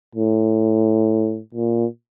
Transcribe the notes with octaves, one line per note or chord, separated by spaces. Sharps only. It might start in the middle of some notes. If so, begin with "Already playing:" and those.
A2
A#2